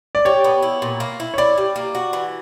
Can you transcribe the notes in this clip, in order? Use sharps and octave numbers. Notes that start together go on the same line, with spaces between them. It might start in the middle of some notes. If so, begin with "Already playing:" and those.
D5
G4 C#5
B3
E4
A#2
A#3
E4
C#5
E4 D5
G3
A#3
F#4
E3